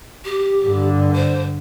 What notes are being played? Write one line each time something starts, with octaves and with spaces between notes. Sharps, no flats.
G4
G2 D3
C5